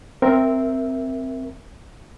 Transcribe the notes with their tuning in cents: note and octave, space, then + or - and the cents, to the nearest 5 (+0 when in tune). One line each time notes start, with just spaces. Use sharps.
C4 +0 A#4 +0 E5 +0